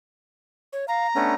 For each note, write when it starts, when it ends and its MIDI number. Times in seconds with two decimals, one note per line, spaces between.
0.73 0.88 73
0.88 1.07 77
0.88 1.35 82
1.16 1.35 57
1.16 1.35 59
1.16 1.35 61
1.16 1.35 62